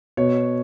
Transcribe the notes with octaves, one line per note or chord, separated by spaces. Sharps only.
B2 C#5